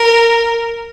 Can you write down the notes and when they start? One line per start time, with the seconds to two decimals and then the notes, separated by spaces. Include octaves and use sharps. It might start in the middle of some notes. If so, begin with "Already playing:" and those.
Already playing: A#4